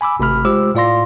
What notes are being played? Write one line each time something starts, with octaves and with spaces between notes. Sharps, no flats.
G#5 B5 D6 E6
G#1 C3 A3 B5 F6
G#3 F4 G4 C5 D6 E6
A2 F4 D5 F5 C6 A#6